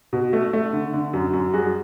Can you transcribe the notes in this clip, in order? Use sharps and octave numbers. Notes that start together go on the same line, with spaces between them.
B2
A3
A3
D3
D3
F#2
F#2
G3 F#4 G#4